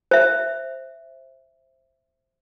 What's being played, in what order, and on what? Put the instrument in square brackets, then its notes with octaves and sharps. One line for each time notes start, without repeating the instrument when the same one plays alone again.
[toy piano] C5 E5